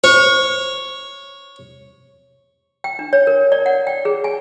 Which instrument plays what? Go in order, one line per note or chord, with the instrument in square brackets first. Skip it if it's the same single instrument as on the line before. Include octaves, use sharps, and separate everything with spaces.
[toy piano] C5 [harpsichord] C#5
[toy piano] G5
D4
C#5
A#4
D5
F#5
G5
G#4
G#5